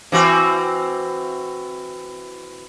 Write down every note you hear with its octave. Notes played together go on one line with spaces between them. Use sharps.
E3 C4 F#4